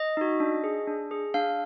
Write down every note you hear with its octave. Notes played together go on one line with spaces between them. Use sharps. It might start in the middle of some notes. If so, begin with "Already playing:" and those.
Already playing: D#5
D#4 F#4
D4
G#4
D4
G#4
D4 F5